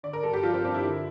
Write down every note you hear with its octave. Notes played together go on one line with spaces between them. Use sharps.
D3 D5
A#4
G2 A4
G4
F3 F4
C4
G2 D4
E4
D3